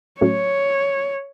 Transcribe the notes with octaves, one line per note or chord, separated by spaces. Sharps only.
A2 F#3 A3 C#4 C#5